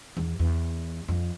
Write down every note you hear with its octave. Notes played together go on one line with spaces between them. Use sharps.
E2
E2
F2